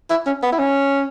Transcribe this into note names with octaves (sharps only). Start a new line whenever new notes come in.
E4
C#4
B3
E4
C#4